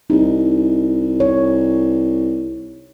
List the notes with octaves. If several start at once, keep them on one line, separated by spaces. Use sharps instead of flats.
C2 D#4
C#5